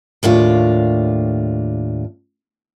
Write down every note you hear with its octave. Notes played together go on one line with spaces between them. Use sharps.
D#2 A2 D4 F4